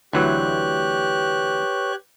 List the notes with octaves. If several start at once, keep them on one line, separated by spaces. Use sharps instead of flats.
D2 E3 F#3 G4 B4 C#5 C#6 F#6